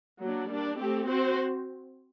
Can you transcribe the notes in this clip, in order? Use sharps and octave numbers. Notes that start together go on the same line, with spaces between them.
F#3 A#3 D4
G3 A#3 D4
A3 C4 G4
C4 F#4 C5